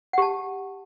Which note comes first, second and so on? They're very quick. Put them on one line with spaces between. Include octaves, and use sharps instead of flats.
F#5 G4 A5